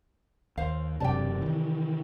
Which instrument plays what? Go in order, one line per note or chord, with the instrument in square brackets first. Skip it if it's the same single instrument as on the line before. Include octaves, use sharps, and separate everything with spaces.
[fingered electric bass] D#2 [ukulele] C5 F5
[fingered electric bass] E1 F#2 [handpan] C3 D5 [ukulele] G5 A5
[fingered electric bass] D#3 E3